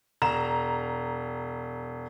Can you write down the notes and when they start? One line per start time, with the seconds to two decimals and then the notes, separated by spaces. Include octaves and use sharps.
0.22 E1 A#5 E7